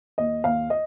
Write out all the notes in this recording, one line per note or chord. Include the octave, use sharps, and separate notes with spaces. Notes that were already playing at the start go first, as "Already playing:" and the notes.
D#2 D#5
D#2 F5
D#5